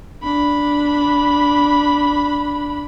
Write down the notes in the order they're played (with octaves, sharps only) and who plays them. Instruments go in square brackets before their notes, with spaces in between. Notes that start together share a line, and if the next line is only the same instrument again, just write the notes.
[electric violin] D4 B5